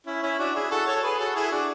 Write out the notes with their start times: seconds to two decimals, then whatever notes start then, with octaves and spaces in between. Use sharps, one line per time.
0.06 C#4 E4
0.23 C#4 E4
0.39 D4 F#4
0.55 E4 G#4
0.71 F#4 A4
0.87 A4 C#5
1.03 G#4 B4
1.19 F#4 A4
1.35 E4 G#4
1.51 D4 F#4